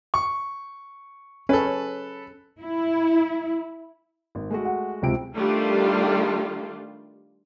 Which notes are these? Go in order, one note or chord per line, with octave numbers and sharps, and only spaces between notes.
C#6
C#4 A4 B4
E4
G#1
G#3 A3 F#4
F#5
C#2 C3 D7
D#3 G3 A3 D4 F4